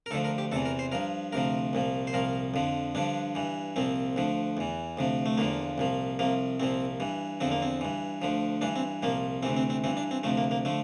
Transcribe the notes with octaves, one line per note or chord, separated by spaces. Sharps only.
A#4
D2 D3 F3 A4
A#4
G4
E2 C3 E3 A4
A#4
C5
G2 F3 A#4
D2 C3 F3 A#4
C2 A#2 F3
C5
C2 A#2 F3 A#4
F2 D3 F3
G2 D3 F3 D4
G2 E3
C2 A#2 F3 C4
D2 D3 F3
E2 E3
D2 C3 F3
A3
E2 D3 F3 A#3
C2 A#2 F3
C2 C3 F3 A#3
C2 A#2 F3 C4
G2 E3
E2 D3 F3 C4
A#3
C4
G2 E3
D2 D3 F3
G2 E3 D4
C4
C2 A#2 F3 A#3
D2 C3 E3 C4
C4
C4
G2 E3 C4
D4
C4
D2 C3 F3 A3
A#3
A#3
D3 F3 A3